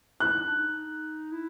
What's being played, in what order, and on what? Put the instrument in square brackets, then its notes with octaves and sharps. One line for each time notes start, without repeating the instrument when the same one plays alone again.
[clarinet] E4 [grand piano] F#6
[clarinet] D#4
D4
D#4
E4